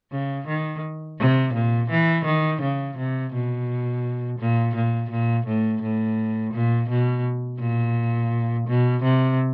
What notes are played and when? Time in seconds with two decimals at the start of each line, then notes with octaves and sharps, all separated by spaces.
0.12 C#3
0.47 D#3
1.19 C3
1.54 A#2
1.90 E3
2.25 D#3
2.62 C#3
2.98 C3
3.33 B2
4.39 A#2
4.75 A#2
5.11 A#2
5.47 A2
5.82 A2
6.54 A#2
6.89 B2
7.60 A#2
8.68 B2
9.03 C3